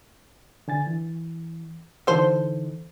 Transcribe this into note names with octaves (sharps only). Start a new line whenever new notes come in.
D3 G#5 A6
E3
D3 E3 D#4 A4 C5